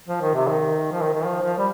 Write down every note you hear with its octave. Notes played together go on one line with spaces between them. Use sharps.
F3
D#3
C3
D#3
F3
D#3
D#3
F3
F3
G3